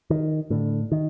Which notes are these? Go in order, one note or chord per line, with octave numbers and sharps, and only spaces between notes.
D#3
A2 D3
D#3